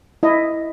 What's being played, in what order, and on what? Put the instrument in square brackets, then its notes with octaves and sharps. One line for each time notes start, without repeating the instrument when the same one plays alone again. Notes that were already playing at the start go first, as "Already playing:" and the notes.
[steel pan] E4 D#5